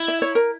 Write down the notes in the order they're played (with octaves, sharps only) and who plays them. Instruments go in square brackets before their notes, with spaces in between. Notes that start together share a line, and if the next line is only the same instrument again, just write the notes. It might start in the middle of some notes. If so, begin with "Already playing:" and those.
Already playing: [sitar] E4
[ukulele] E5
C#5
A#4